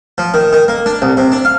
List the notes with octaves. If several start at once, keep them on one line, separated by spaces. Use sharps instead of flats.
F3
D#3
D#3
A#3
D4
C2
C3
D4
F5